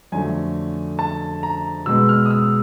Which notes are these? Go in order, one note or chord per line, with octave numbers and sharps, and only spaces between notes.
F2 D3 F#3 A3 G#5
A5
A#5
B2 G#3 B3 E6
F6
D#6
E6